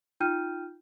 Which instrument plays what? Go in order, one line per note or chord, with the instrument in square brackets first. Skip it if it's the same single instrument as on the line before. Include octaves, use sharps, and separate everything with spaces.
[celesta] D#4 F4 G5 F6 G6 D#7